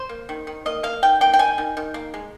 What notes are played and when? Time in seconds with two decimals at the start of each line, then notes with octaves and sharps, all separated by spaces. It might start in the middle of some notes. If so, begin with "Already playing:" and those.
Already playing: C5
0.09 A#3
0.29 D#3
0.47 D#3
0.66 A#3 D#5
0.83 A#3 F5
1.03 D#3 G5
1.21 A#3 G5
1.33 G5
1.39 D#3 G#5
1.58 D#3
1.77 D#3
1.94 A#3
2.14 G#3